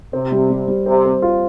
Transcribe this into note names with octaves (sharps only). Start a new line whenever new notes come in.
C3 C4
G3
G3
G3
C3 C4
C4
F4